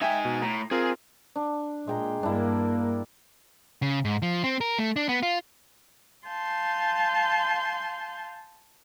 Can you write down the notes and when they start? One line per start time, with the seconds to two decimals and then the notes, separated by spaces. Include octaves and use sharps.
0.02 D#4 E5 G5 G#5
0.25 B2
0.42 A2 A#5
0.71 C4 F4 G#4 A#4
1.36 D4
1.87 A#2 G#3 G5 A#5
2.23 G2 A#3 D4 E4
3.82 C#3
4.05 G#2
4.22 F3
4.44 C4
4.61 A#4
4.79 A3
4.96 D4
5.09 B3
5.23 F4
6.26 F5 G#5 A5 C6 G6